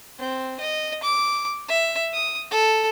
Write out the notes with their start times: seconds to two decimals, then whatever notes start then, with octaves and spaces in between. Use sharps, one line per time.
0.19 C4
0.60 D#5
1.04 D6
1.68 E5
2.14 D#6
2.51 A4